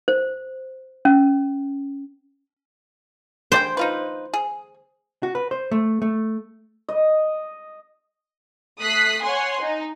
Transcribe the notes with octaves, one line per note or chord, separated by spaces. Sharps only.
C5
C#4
G#3 C5 D5 G5
D#4 F4 B4
G#4
F#4
B4
C5
A3
A3
D#5
A3 D#6 F#6 B6 C7
C#5 F#5 G#5 C6
D#4